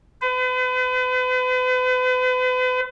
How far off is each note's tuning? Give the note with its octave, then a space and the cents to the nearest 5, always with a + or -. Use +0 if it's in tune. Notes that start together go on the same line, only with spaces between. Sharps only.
B4 +40